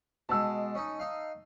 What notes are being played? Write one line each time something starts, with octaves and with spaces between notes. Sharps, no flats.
B2 G#3 A5 E6
C#4 D#4
D#4 F5